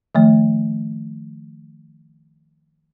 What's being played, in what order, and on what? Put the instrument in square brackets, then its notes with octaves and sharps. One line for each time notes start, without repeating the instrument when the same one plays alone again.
[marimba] D#3 F3 A3